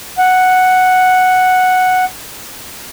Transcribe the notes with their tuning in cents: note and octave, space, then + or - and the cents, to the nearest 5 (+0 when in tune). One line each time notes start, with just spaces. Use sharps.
F#5 +0